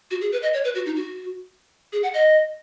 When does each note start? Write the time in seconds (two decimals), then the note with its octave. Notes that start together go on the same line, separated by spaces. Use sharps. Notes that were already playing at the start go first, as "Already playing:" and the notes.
0.11 F#4
0.21 G#4
0.32 B4
0.43 D#5
0.54 C#5
0.64 B4
0.75 F#4
0.86 D#4
0.96 F#4
1.93 G#4
2.03 F#5
2.14 D#5